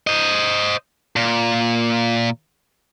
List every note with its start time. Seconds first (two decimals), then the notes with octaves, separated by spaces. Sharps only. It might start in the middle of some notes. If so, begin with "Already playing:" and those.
0.07 C5 D#5
1.16 A#2